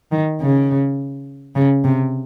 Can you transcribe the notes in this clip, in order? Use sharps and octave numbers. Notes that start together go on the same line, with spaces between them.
D#3
C#3
C#3
C3